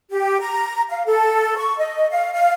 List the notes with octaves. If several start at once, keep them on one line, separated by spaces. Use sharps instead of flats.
G4
A#5
F5
A4
C#6
D#5
F5
F5